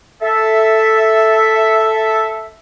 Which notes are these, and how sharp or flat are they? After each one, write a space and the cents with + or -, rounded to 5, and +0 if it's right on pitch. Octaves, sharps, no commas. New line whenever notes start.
A4 +0 E5 -5